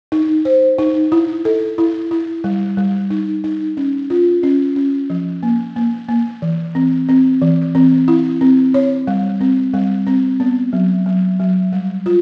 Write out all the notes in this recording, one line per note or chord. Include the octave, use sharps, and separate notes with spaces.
D#4
C5
D#4
E4
A4
E4
E4
G3
G3
D#4
D#4
C#4
F4
C#4
C#4
F3
A#3
A#3
A#3
E3
C4
C4
E3
C4
E4
C4
C#5
G3
C4
G3
C4
B3
F#3
F#3
F#3
G3
F4